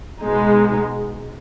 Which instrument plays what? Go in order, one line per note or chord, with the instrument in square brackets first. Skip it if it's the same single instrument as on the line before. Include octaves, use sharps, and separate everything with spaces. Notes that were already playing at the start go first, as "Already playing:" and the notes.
[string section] B2 G#3 D#4